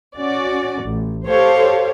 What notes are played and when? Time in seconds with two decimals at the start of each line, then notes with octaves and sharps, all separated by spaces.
0.17 C#4 F#4 D5
0.83 A1
1.27 G4 A4 C5 C#5 F5